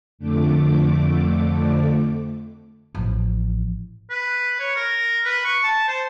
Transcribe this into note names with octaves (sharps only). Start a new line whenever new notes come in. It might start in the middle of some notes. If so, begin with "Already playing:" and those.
F2 D3 A3 D6
A1 F3
B4
C#5
A#4
B4
C#6
A5
C5